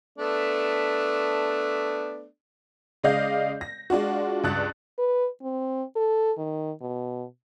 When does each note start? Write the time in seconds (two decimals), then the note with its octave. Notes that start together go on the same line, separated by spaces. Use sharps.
0.18 A3 B3 D4
3.04 C#3 G#3 D5 D#5 F5 G6
3.61 A#6
3.90 G#3 D4 F4 F#4
4.44 C#2 G2 D4 F#6 A6
4.98 B4
5.42 C4
5.95 A4
6.37 D#3
6.81 B2